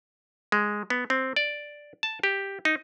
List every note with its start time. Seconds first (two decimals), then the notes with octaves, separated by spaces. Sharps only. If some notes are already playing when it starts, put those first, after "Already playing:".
0.52 G#3
0.90 B3
1.10 C4
1.36 D5
2.03 A5
2.23 G4
2.65 D#4